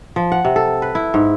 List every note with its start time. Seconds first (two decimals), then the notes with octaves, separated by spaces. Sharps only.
0.16 F3
0.32 F#5
0.45 C3
0.56 A4
0.82 B4
0.95 E4
1.14 G#2